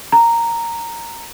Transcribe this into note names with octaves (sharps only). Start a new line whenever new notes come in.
A#5